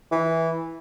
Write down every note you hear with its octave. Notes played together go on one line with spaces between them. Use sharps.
E3